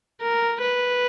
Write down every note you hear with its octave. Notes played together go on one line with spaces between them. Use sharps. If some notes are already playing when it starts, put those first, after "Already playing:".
A#4
B4